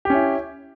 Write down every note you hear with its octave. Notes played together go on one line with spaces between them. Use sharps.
C#4 E4 G4